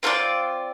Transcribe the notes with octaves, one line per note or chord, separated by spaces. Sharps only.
C4 F4 A#4 D5